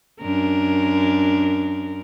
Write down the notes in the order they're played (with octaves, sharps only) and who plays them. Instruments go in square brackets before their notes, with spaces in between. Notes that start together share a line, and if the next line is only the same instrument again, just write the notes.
[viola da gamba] F#2 D4 A#4